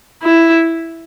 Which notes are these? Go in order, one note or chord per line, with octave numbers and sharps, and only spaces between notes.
E4